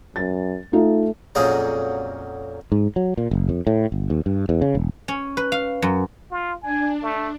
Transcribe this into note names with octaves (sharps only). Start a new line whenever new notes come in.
F#2 A6
A3 D#4 F4
F2 A#2 F#3 C#4 G#4 A#5
G#2
F#3
A#2
F#1
F2
A2
G1
D#2
G2
E2
C#3
E1
C#4
B4
F5
F#2
F4
D4 G#5
A3